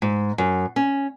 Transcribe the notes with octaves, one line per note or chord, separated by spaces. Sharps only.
G#2
F#2
C#4